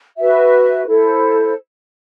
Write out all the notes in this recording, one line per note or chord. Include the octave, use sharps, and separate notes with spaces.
F#4 B4 E5
E4 A4 C5